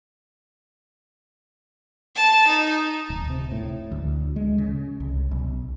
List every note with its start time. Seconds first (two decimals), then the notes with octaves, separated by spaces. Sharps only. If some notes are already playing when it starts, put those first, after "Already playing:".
2.15 A5
2.47 D#4
3.10 D1
3.30 C3
3.52 A2
3.92 D2
4.36 G#3
4.58 C#3
5.00 C2
5.31 B1